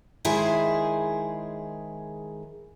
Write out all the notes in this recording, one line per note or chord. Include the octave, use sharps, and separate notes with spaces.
D#3 G#3 E4 G#4 C5